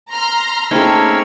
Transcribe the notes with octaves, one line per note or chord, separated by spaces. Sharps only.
A#5 C6 F6
A3 A#3 C4 C#4 D#4 G#4 B5 E6